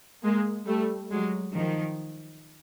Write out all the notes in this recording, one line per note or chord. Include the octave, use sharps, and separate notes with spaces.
G#3 A#3
G3 A3
F#3 G#3
D#3 F3